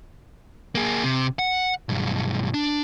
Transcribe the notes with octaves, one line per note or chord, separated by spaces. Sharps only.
A#3 G#4
C3
F#5
B1 G2
D4